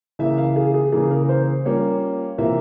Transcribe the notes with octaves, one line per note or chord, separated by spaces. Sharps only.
C#3 E3 A#3 E4 E5
F5
G#4
G#4
C#3 E3 A#3 G#4
A#4
C5
G3 A#3 C#4 F4 C#5
C3 E3 A#3 F4 E5